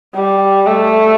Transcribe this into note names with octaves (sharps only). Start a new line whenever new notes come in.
G3
A3